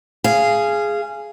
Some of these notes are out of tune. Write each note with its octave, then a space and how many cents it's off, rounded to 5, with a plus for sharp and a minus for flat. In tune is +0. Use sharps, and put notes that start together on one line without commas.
G#4 +0 F5 -20